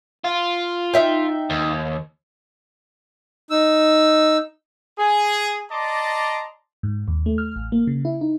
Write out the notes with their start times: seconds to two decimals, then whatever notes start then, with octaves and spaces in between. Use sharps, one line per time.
0.24 F4
0.94 D#4 E5 G5
1.50 D#2
3.51 D#4 E6
4.99 G#4
5.71 D5 D#5 A5 A#5 C6 D6
6.83 G#2
7.08 D#2
7.26 A3
7.38 F6
7.56 A1
7.72 A#3
7.87 C#3
8.05 E4
8.21 D#4